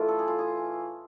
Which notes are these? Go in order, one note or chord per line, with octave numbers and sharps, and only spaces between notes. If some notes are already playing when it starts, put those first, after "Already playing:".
Already playing: A2 E3 A3 F4
A4
G#4
F4
G#4